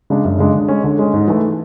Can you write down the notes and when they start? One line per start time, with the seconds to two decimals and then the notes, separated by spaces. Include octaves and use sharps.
0.10 C#3 G#3 D4
0.24 F#2
0.39 C#3 G#3 D4
0.54 D3
0.68 G#3 C#4
0.84 D3
0.99 G#3 C#4
1.14 G#2
1.28 E3 A3